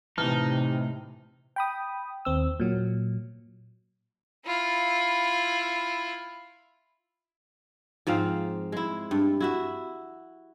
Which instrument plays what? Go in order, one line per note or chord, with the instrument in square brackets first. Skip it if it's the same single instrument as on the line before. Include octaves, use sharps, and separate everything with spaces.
[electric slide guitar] A2 A5 [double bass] C3 [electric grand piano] E3 F6 [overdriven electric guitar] D#4
[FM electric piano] G5 B5 D#6
D#2 C4 E6
A#2 F#3
[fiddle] E4 F4
[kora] G#2 F3 C4 F5
G#3 E4
G2
E4 F#4 E5